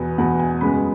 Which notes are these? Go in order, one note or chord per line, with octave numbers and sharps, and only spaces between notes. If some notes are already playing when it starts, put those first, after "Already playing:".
Already playing: E2 B2 B3
E2 B2 B3 F#5
G#5
F#2 C#3 G#3 B3 B5